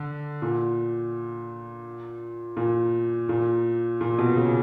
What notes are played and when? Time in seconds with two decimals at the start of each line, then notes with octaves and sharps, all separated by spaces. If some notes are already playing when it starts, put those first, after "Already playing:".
Already playing: D3
0.42 A#2
2.57 A#2
3.29 A#2
4.01 A#2
4.18 B2
4.36 C#3